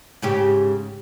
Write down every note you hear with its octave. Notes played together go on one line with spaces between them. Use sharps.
G#2 C#3 G4